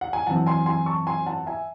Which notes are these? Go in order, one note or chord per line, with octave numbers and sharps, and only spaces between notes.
F#5
G#5
F#2 E3 C4 F#5 A5
G#5 C6
G#5 C6
A5 C#6
G#5 C6
F#5 A5
E5 G#5